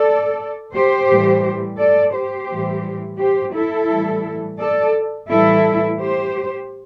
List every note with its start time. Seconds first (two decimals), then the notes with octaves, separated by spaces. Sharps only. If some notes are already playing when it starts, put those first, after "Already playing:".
Already playing: A4 D5
0.74 G4 C5
1.09 A2 E3 G3
1.79 A4 D5
2.14 G4 C5
2.49 A2 E3 G3
3.19 G4 C5
3.54 E4 A4
3.89 A2 E3 G3
4.59 A4 D5
5.29 A2 E3 G3 E4 A4
5.99 G4 C5